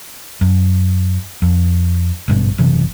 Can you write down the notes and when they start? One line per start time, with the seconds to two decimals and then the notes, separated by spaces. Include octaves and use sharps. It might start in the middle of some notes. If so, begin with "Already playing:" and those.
0.41 F#2
1.42 F2
2.28 G#1 G2 B2
2.58 F#1 C3 E3